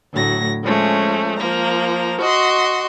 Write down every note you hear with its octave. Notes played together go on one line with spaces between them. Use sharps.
D2 A2 F#3 A#6
F3 G#3 A3 C#4
F3 A#3 A#5
F#4 D#5 C6